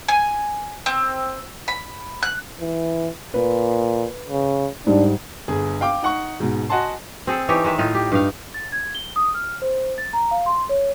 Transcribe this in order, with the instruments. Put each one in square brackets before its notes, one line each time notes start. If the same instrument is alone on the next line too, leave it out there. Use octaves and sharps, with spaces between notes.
[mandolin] G#5
C4
B5
F#6
[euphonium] E3
[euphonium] A#2 [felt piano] B4
[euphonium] C#3
[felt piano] G#2 G3 [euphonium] D4
[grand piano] G1 G#4
F5 G5 D6
D#4 F#5 C#6
G#2 B2
F#4 D#5 F#5 G#5 A5 C6
[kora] C4 G#4 A4
E3 D#4 G4 C#5
D#3 G#3 E5
A2 D#4 F4
G4
G2 D#4 F5
[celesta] A6
G#6
G7
D#6
F6
C5
A6
A#5
F5
C6
C#5